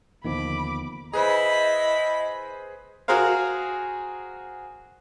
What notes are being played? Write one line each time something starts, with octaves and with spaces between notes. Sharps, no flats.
D#2 D3 D#3 F3 B3 B5 D6
E4 G#4 B4 C5 D#5 B5
F#4 G#4 A#4 C5 F5